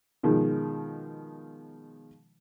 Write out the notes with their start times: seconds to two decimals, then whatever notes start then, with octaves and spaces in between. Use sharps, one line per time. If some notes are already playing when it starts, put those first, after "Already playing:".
0.23 B2 D#3 F3 G#3